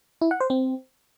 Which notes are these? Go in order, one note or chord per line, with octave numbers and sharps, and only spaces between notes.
E4
F#5
C5
C4